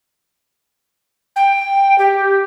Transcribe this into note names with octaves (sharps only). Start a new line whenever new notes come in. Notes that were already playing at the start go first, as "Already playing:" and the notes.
G5
G4